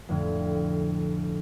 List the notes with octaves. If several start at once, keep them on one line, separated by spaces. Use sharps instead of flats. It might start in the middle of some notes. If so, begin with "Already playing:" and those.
F2 A2 D3